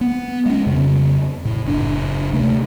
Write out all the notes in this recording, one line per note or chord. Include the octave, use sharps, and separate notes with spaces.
B3
G#3 C#4
F2 C#3
A2
F#1 D4
D2 C3 A3